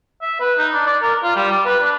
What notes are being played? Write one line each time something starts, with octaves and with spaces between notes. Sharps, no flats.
E5
B4
D#4
D4
D5
A#4
F4
G3
D5
B4
D4